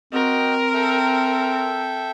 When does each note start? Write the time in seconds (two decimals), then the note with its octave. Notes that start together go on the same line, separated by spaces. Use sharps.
0.13 C4 F#4 A#4 D#5 G5
0.74 A4 E5 G5